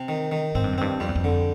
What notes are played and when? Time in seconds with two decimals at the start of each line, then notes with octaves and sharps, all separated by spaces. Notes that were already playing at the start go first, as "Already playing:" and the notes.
Already playing: C3
0.08 D#3
0.31 D#3
0.55 G#2 C4
0.64 G2
0.73 F#2
0.78 G2 C4
1.00 F2 G3
1.09 E2
1.16 F2
1.24 D3